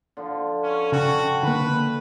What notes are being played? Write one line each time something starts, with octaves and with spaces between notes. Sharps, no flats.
D3 F3 C5
C#4
C#3 F#4 A4 G5 B5
D3 A#3 B4